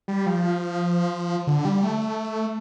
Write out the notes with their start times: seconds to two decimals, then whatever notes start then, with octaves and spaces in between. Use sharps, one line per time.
0.08 G3
0.26 F3
1.47 D3
1.65 G3
1.83 A3